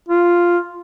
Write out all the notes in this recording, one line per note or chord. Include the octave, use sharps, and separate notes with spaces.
F4